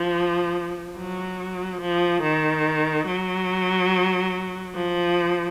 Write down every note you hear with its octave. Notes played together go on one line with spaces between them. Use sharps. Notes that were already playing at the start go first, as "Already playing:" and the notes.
Already playing: F3
F#3
F3
D#3
F#3
F3